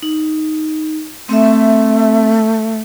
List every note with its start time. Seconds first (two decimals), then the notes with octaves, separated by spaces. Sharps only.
0.03 D#4
1.29 A3 C4 E5